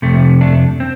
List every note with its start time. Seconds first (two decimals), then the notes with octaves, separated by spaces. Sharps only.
0.02 F2 C3 A3
0.41 A3 D4
0.80 C4